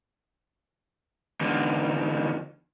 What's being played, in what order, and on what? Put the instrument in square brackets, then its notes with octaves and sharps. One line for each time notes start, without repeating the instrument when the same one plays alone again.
[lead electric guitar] E2 D3